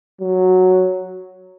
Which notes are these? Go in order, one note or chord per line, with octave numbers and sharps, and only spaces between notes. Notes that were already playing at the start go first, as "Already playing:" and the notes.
F#3